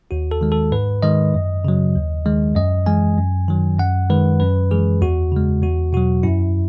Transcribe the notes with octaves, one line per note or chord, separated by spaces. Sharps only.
D#2 F#4
A4
D#3 G#3
A4
G#2 B4
D#3 G#3 D#5
F#2
C#3 F#3
D#2
D#3 G#3
F#2 D#5
E3 G#3 G#5
F#2
D#3 F#3
F#2 F#5
D#3 G#3 B4
F#2 B4
E3 G#3 G#4
E2 F#4
C#3 G#3
E2 F#4
B2 F#3 F#4
F#2 E4